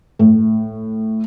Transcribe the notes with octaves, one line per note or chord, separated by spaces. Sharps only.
A2